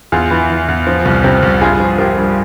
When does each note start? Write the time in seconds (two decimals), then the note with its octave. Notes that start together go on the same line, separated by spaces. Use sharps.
0.12 E2 F4 G#4
0.31 E3
0.50 E3
0.68 E2
0.87 F3
1.05 C2
1.24 C3
1.43 C2
1.61 G2 F4 G#4
1.80 F3
1.98 F3 G4 A#4
2.17 G2